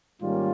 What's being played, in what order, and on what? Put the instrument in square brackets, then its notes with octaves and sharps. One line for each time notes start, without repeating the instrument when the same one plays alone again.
[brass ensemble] G#2 D#3 G3 A#3 C#4 F4